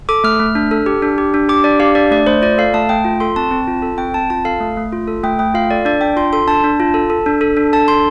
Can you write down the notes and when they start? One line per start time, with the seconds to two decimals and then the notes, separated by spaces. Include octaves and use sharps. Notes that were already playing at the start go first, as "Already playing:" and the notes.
0.09 A4 D6
0.24 A3 F6
0.40 A3
0.55 D4
0.71 A4
0.86 G4
1.02 D4
1.18 G4
1.34 D4
1.49 G4 D6
1.64 D4 D5
1.80 G4 F5
1.95 D4 D5
2.11 A3 D5
2.27 A3 C5
2.42 F4 D5
2.58 A4 F5
2.74 A3 A5
2.89 A3 G5
3.05 F4
3.20 A4 C6
3.36 C4 A5
3.51 C4
3.67 F4
3.82 A4
3.98 C4 G5
4.14 C4 A5
4.30 F4 A5
4.45 A4 F5
4.60 A3
4.77 A3
4.93 F4
5.08 A4
5.23 A3 G5
5.39 A3 G5
5.54 F4 F5
5.71 A4 D5
5.85 D4 D5
6.01 D4 G5
6.16 F4 C6
6.33 A4 C6
6.47 D4 A5
6.64 D4
6.80 F4
6.94 A4
7.10 A4
7.26 D4
7.41 A4
7.57 D4
7.73 A4 A5
7.88 D4 C6